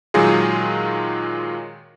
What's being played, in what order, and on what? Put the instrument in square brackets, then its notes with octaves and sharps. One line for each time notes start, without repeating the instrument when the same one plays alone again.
[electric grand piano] A#2 D#3 F#3 G#3 F4 G#4